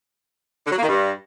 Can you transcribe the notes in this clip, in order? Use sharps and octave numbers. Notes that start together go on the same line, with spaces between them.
D3
F#3
A#3
D#3
G2